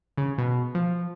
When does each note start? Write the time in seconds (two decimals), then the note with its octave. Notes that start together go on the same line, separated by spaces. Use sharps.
0.17 C#3
0.38 B2
0.75 F3